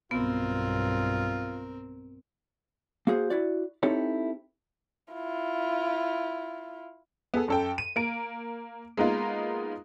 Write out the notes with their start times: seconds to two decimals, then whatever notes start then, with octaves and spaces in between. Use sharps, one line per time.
0.11 B1 G2 B3 C4 F4 A#4
3.07 A#3 F#4 G#4 C5
3.30 E4 F#4 D5
3.83 C4 D#4 E4 G4 A4 C#5
5.13 E4 F4
7.34 B3 G#4 A4
7.48 F#2 A4 G5
7.78 D#7
7.96 A#3 D7
8.97 G#3 A#3 B3 D#4 F4